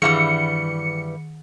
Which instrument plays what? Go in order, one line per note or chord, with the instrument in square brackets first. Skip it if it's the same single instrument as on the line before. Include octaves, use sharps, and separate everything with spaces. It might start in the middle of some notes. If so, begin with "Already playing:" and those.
[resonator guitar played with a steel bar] G2 E3 G3 [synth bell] D#3 [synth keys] C#7